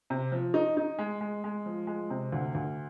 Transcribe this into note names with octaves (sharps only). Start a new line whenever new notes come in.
C3
F3
D#4
D#4
G#3
G#3
G#3
F3
G#3
C3
D2
D2